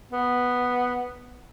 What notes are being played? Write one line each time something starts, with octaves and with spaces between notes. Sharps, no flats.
B3